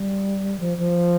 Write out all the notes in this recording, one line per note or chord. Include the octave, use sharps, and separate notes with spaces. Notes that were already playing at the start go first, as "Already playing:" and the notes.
Already playing: G3
F3
F3